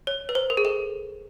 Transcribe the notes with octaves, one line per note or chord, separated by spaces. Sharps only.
C#5
B4
C5
A#4
G#4
A4